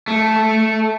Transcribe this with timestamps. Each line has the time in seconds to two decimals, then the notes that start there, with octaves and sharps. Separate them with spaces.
0.08 A3